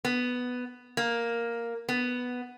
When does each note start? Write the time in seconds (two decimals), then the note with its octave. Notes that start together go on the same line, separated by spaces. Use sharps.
0.05 B3
0.97 A#3
1.89 B3